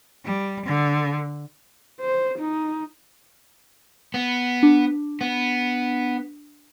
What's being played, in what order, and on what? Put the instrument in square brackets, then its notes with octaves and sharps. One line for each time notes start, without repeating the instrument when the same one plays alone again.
[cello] G3
D3
[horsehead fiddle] C5
D#4
[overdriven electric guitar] B3
[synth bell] D4
[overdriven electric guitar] B3